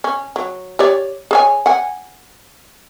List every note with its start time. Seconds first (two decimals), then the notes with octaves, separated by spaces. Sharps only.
0.04 C#4
0.36 F#3
0.79 G4 C#5 D5
1.31 G#4 C#5 G#5
1.66 F#5 G#5